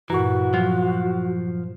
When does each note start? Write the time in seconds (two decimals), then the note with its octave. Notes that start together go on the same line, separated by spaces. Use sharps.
0.10 G2 A#2 E3 F#4
0.54 F3 F#3